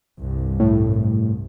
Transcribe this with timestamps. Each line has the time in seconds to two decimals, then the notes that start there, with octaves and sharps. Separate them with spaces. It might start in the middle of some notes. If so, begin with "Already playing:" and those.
0.19 C2 G2
0.60 A2